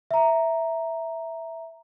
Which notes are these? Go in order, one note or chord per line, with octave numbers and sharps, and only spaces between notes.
E5 A#5